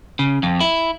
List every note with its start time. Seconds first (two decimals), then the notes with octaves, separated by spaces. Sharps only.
0.19 C#3
0.43 F2
0.60 E4